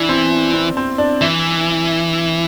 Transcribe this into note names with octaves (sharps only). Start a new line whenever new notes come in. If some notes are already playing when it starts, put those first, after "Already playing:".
Already playing: E3 D4 E4
C4
C4
C4
D4
E3 E4